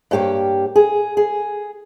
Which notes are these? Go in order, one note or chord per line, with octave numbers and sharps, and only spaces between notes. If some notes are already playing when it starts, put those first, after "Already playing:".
G2 A#3 G4 C#5 G5
G#4
G#4